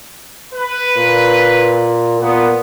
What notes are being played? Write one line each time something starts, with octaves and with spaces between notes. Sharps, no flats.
B4
A#2
A#2 B3